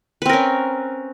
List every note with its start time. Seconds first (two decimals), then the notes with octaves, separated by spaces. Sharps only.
0.22 B4
0.26 C4
0.29 A#4
0.33 C#4